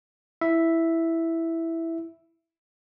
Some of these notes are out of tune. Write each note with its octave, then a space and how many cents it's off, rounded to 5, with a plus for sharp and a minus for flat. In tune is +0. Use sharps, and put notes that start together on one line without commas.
E4 +0 E5 +0